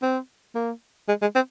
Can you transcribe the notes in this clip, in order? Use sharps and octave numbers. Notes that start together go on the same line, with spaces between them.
C4
A#3
G#3
G#3
C4